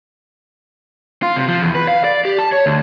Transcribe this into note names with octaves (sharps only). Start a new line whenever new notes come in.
F4
C3
F3
E2
B4
F5
D5
G4
A5
C#5
D2